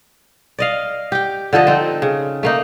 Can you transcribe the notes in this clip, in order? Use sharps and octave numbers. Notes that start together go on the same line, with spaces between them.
D5 D#5 F5
G4 G5
D3 F3 A4 D#5
C4 D#4
C#3
A3 A#3 D#4